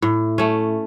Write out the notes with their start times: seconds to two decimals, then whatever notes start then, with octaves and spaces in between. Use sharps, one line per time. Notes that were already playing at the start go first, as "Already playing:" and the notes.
0.02 A2
0.38 A3 C#4